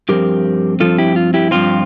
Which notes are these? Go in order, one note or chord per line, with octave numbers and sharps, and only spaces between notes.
G2 F3 C4 G4 A#4
G2 F3 C4 F4 A4
E4 G4
F4
E4 G4
G2 F3 C4 F4